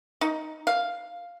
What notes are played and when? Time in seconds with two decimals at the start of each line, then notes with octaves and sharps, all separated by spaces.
0.21 D#4
0.67 F5